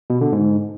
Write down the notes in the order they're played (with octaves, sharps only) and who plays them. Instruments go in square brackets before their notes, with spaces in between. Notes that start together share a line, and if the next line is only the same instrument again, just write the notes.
[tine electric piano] B2
D3
G#2